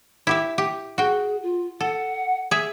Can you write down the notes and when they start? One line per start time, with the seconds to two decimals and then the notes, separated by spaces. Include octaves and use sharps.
0.27 E4 G4 E5
0.58 G4
0.98 F#4 G#4 G5
1.43 F4
1.80 A4 F#5
2.51 G#4 E5